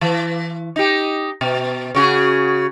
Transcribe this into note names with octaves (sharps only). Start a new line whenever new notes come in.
E3
D#4 G4
B2
C#3 F#4 G#4